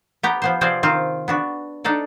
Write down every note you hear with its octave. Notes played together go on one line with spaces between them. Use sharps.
B3 G4 A#5
F3 B3 C5
C3 F3 C4 G#4 C5 D5
D#3 C4 F4
B3 D4 F#4
D4 D#4 A4 D5